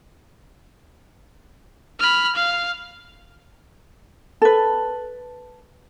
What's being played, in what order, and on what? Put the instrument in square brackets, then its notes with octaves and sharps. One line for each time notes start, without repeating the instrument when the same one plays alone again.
[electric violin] B5 F6
F5
[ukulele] A4 B4